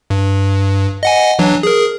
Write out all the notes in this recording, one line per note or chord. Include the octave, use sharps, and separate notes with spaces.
G2
D#5 F#5 G#5
E3 F#3 D4
G#4 A#4